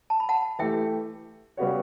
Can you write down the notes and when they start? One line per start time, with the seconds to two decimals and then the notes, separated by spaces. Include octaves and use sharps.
0.10 A5
0.20 B5
0.29 F#5 A5
0.59 E3 A3 E4 G4 E5 G5
1.57 C#3 G3 B3 F#4 C#5